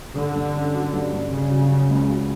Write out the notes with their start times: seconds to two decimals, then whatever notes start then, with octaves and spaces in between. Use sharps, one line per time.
0.15 G2 D3
0.35 G2
0.55 C#4
0.74 F#3
0.93 G2
1.12 G2
1.31 C#3 C#4
1.51 F#3
1.71 C#4
1.90 C#2
2.10 F#3